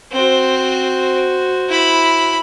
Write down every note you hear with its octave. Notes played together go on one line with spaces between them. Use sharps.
C4 F#4 C5
E4 B5